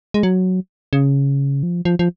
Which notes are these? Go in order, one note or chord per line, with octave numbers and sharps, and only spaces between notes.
G#3
F#3
C#3
F3
F3
F3